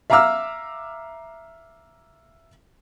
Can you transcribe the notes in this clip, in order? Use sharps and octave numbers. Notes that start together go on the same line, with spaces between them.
E5 F5 A#5 D6 E6 F6